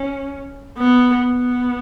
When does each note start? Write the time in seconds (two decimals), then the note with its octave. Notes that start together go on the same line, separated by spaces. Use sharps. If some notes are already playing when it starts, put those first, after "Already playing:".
Already playing: C#4
0.78 B3
1.31 B3